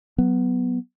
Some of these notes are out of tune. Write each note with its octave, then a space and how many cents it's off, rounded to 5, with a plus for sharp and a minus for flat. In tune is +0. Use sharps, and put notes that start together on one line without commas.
F#3 +5 B3 +0